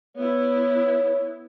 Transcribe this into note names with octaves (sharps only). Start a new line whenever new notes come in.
B3 E4 C#5